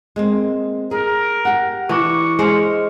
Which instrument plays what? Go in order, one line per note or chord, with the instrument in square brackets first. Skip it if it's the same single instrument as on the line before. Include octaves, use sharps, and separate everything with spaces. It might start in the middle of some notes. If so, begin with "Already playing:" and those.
[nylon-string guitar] G#3 A#3 C4
[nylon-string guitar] G#4 [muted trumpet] A#4
[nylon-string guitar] G4 F#5
[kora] E3 D4 [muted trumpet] C#6
[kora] G#3 F5 [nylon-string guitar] C5